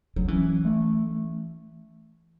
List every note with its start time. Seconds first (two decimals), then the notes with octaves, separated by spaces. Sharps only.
0.16 F#3
0.28 E3 C#4
0.65 A3